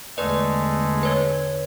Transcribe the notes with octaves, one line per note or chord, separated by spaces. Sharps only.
E2 D3 G#3 A3 B4 D5
B4 C#5 G#6